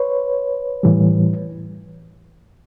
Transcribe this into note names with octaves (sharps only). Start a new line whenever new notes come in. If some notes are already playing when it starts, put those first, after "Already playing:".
Already playing: B4 C#5
A2 E3 G3